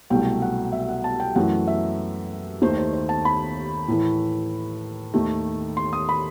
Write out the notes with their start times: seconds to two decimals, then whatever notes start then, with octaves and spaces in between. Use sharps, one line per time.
0.10 C2 B2 F#3 A3 G5
0.42 F#5
0.72 E5
0.89 F#5
1.04 A5
1.20 G5
1.35 F#2 E3 A3 F#5
1.67 E5
2.62 D#2 D#3 A3 C5
2.78 C5
2.93 C5
3.09 A5
3.25 B5
3.88 A2 E3 A3
5.14 D#2 D#3 A3
5.77 C6
5.93 D#6
6.09 B5